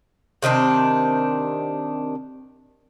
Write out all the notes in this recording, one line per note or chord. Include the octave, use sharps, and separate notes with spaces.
C3 D#3 C4 D4